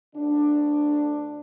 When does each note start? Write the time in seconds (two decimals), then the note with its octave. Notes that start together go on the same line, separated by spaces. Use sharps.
0.15 D2 D3 D4